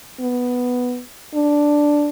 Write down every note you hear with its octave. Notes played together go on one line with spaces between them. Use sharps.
B3
D4